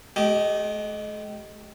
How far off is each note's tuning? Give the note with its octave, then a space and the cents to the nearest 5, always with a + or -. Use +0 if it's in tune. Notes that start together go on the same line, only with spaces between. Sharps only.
A3 -45 G4 -15 D#5 +0